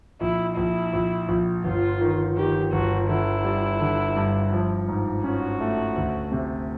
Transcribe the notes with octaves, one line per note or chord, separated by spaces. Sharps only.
A#1 E4
A#1 E4
A#1
A#1
G1 F4
D#3
D#3 G4
G1 F#4
D3 E4
G3
D3
G2
F3
G#2
C#4 F#4
A3
D2
C3